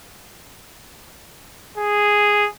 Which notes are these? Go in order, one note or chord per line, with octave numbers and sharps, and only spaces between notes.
G#4